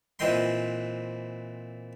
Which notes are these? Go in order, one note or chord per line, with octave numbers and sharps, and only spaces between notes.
A#2 E3 C4 D#5 G5 C6